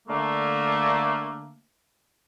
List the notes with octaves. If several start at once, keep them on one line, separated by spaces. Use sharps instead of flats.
D3 A3 A#3